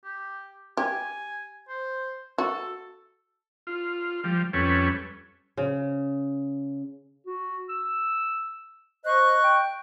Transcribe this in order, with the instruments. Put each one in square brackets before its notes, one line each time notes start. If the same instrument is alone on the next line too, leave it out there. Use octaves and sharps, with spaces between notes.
[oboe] G4
[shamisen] G4 [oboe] G#5
[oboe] C5
[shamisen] F#4 [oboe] A4
[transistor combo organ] F4
F3 G3
F2 G3 C#4 A4 B4 C#5
[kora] C#3
[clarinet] F#4
E6
[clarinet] C5 [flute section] D#5 C#6 F#6
[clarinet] G5